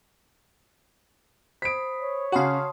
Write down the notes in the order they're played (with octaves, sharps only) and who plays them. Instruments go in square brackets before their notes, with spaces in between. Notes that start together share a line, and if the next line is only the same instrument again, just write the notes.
[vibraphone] C5 B5 D#6 [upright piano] B6 D7
[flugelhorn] C#5
[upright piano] C#3 F#5 [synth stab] F#4 F5 [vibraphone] A5 C6 D#6